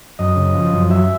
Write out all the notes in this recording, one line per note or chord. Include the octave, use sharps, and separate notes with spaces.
F#2 D#5
C#3
F3
F#2
F#3 E5